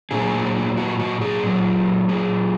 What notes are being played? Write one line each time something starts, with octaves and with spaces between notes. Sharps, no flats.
A#2 F#3 A#3 G#4
F#4
F#4
G#4
A#2 F#3 C#4
G#4